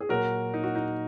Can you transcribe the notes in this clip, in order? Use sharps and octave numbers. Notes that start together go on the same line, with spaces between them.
G#4
A#2 F#3 F#4 A#4
D#4
F#4
D#4